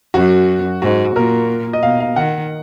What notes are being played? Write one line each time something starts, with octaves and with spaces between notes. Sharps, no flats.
F#2 F#4
G#2 F#4
A#2 A#4
D#5
B2 F5
F5
D#3 F#5